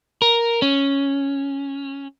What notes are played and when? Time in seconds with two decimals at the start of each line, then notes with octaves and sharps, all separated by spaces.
0.22 A#4
0.62 C#4